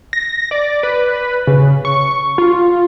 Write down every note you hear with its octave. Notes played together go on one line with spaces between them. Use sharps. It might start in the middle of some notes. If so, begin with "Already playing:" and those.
A#6
D5
B4
C#3
C#6
F4